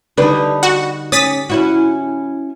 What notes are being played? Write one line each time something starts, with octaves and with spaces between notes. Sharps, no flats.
D3 G3 D4 D#4 B4
F#4
C#4 D5 D#6 A6 B6
C#4 E4 F#4